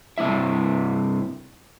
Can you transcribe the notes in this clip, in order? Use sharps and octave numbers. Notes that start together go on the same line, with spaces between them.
G2 C3 G3 E4 E5